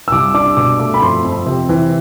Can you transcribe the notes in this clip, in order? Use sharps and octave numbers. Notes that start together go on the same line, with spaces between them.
E6
C2 D6
D4 D6
B2 D6
A3 D6
B5
F2 C6
F2
C3
E3